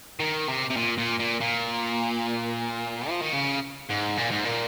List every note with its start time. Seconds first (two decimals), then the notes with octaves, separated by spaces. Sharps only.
0.20 D#3
0.48 C3
0.70 C3
0.77 A#2
0.98 A#2
1.20 A#2
1.41 A#2
3.09 F3
3.21 D#3
3.33 C#3
3.90 G#2
4.18 A#2
4.31 G#2
4.45 A#2